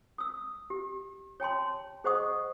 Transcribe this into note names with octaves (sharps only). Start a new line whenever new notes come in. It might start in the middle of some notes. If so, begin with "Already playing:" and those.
D#6 E6
G4
C#5 G5 A5 C6
G#4 C5 D#5 F#5 C#6 D#6